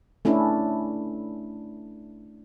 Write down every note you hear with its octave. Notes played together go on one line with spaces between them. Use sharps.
A3 C#4 D4 E4